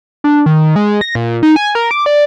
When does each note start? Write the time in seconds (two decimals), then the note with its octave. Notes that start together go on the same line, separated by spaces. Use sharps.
0.24 D4
0.46 D#3
0.76 G#3
1.01 A#6
1.15 A#2
1.43 D#4
1.56 G#5
1.75 A#4
1.91 D6
2.06 D5